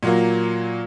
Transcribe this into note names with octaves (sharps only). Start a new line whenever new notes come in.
A#2 F#3 A#3